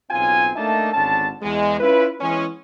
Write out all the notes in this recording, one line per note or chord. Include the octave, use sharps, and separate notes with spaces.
B1 C#3 C4 F4 G#5
A3 A#3 D4 D#4 E5 A5
G#1 D3 C#4 A5
E2 G#3
C#4 E4 F4 B4
E3 G#3 B3 C#4